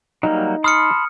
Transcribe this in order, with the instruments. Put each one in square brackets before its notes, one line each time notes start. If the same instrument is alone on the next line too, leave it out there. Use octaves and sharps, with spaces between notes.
[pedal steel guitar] F#3 G3 A#3 [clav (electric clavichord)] D#4
[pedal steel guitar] A5 B5 C6 [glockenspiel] D#6 F6 C#7